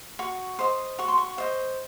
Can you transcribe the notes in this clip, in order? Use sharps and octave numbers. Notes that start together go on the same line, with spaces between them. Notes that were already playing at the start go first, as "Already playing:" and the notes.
F#4 C#6
C5 D#5
F#4 C#6
C6
C#6
C5 D#5